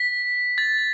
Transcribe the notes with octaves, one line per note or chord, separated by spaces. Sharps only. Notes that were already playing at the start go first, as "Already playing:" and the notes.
Already playing: B6
A6